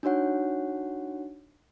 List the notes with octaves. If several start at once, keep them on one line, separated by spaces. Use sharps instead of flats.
D4 D#4 F#4 C#5 F#5